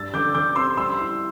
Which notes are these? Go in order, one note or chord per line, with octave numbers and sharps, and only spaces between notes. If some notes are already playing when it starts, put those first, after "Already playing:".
Already playing: G2 E6 A6
D3 D6 G6
D3 D6 G6
C4 C6 E6
G3 C6 E6
E4